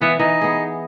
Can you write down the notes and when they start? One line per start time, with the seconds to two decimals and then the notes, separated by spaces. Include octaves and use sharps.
0.01 E3 B3 E5 F5
0.19 E3 D#4
0.41 B3 G#4